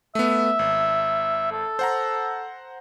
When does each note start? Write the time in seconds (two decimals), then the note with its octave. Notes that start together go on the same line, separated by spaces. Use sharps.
0.15 A3 B3 E5
0.59 G#1
1.52 A4
1.79 C5 F#5 A#5